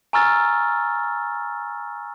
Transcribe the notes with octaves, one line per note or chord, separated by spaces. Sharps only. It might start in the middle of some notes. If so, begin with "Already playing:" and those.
G#5 A#5 C#6 E6 F6 A6